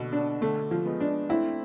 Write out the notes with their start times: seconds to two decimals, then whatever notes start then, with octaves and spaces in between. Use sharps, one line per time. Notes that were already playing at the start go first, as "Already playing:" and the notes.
Already playing: B2 D3
0.13 D4
0.41 D3 A3
0.71 F3
0.85 G#3 B3
1.00 D4
1.29 A3 C4 E4